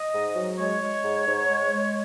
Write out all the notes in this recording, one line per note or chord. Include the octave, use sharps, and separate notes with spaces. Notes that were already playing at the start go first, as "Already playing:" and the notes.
Already playing: D#5
G#2
F#3
G#3 C#5
G#3
G#2
G#2
G#3
G#3